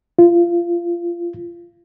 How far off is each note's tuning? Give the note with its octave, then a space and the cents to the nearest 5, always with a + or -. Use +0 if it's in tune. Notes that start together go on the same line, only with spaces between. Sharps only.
F4 -20